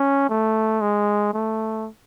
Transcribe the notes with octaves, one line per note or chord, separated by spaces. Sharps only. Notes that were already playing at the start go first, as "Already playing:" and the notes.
Already playing: C#4
A3
G#3
A3